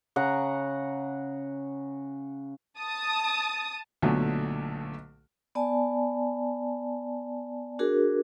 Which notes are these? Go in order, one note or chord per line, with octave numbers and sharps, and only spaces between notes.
C#3 F#5 A#5
A5 D#6
B1 A#2 D3 F#3 A3
B3 D5 G#5 A5
D4 F#4 G#4 A#4